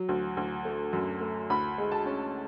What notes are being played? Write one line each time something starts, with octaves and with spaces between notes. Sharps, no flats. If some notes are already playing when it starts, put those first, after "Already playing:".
Already playing: F#3
D2
D2
A3
F#2
A3
D2 B5
G#3
A5
C#4